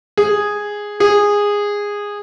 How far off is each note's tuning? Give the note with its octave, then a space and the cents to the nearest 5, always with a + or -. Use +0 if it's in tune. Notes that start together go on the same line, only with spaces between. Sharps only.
G#4 -5
G#4 -15